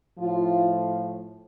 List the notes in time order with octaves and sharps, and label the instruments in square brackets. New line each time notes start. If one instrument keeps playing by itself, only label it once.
[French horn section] A2 F3 F4